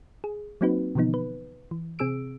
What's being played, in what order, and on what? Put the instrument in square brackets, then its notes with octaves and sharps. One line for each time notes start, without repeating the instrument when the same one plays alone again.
[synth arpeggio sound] G#4
F#3 A#3 C4 D#4 F#4 B4
B2 D3 E3 F3 B3 D#4
B4
E3
C3 C4 G#4 E6 D7